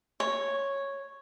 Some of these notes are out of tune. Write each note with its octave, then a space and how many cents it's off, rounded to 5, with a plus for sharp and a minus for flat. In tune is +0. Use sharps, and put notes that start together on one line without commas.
C#5 -5